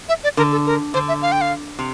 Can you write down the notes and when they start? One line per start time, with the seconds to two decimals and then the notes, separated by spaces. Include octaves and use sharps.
0.09 E5
0.24 D5
0.37 D3 A#4
0.52 A4
0.66 A#4
0.94 D3 C5
1.08 E5
1.22 F5
1.32 G5
1.41 F5
1.79 C3